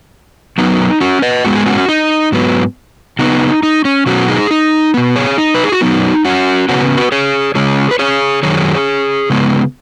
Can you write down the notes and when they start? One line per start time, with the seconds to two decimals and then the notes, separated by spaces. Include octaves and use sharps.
0.58 F#2 F#3 B3 D#4
1.00 C#4 F#4
1.22 B4 D#5
1.44 G#2 G#3 B3 F#4
1.55 G#4
1.66 C#4 F#4
1.89 D#4
2.32 G#2 F#3 B3
3.19 C#3 B3 D#4
3.63 D#4
3.85 C#4
4.06 B2 F#3 B3 C#4 F#4
4.28 D#4 G#4
4.51 D#4
4.94 B2 B3
5.16 G#4 C#5
5.38 D#4
5.55 B4
5.64 G#4
5.72 F#4
5.81 F#2 F#3 B3 D#4
6.25 C#4 F#4
6.69 C#3 B3 C#4 F#4
6.97 F#4 B4
7.12 G#4 C#5
7.55 C#3 G#3 C#4 G#4 C#5
7.91 B4
7.99 G#4 C#5
8.43 F#2 D#3 F#3 G#4 C#5
9.30 C#3 G#3 B3